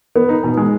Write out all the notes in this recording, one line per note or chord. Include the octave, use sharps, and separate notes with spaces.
B3
D#4
B2
G#3